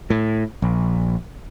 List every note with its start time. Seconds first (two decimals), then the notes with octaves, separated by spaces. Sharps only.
0.10 A2
0.62 A#1